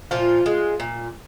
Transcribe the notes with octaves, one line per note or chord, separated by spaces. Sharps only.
A#2 F3 F4
G#3
A#2